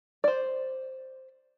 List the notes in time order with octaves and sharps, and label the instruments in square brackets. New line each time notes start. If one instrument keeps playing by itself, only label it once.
[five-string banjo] C5 D5